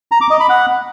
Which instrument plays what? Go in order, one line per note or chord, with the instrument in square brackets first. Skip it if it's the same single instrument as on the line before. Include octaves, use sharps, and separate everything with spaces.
[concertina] A#5
D6
D#5
B5
F#5